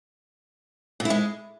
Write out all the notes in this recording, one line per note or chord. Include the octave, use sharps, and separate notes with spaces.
A#2
E4
G#3